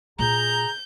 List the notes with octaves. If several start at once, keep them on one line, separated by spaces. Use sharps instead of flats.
A#2 F4 G#4 A#5 G6